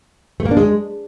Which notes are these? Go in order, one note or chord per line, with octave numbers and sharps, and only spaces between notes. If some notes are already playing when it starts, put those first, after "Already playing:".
A3
A#3
D4
G#3